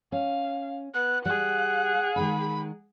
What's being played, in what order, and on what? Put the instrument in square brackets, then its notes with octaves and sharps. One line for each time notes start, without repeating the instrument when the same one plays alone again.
[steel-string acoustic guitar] C#4 [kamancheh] F5
[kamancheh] B3 [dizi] F#6
[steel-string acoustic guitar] G3 [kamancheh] G#4 F#5 [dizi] F#6
[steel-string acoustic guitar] D#3 G#3 D#4 [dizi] B5